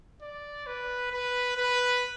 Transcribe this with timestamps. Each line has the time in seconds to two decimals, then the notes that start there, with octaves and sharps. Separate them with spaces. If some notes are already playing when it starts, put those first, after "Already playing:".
0.22 D5
0.66 B4
1.11 B4
1.57 B4